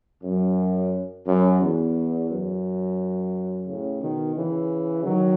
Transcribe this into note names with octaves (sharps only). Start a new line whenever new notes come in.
F#2
F#2
E2
F#2
A2 C#3
B2 D#3
C#3 E3
D#3 F#3